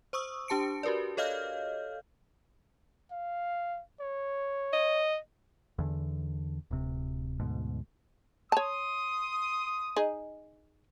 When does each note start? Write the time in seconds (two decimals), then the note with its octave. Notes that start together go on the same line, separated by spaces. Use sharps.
0.13 C5 C#6 D#6 E6
0.48 D4 G4 A5 C#7 D7
0.83 F#4 G4 A#4 B4 D5
1.17 A4 C#5 D#5 F5 F6 G6
3.11 F5
4.00 C#5
4.73 D#5
5.79 E2 D3
6.71 D1 C3
7.39 D2 G#2 B2
8.52 C#5 A5 C6 D#6
9.96 D#4 G#4 D#5